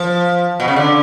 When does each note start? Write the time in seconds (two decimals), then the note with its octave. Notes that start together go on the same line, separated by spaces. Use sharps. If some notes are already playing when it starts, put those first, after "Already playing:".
Already playing: F3
0.60 B2
0.68 C#3
0.76 D3